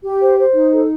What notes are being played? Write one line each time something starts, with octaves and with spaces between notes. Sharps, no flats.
G4
C5
C5
D#4
A4